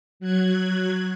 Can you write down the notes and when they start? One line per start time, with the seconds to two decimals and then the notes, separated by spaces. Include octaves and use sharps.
0.20 F#3 F#6 G#6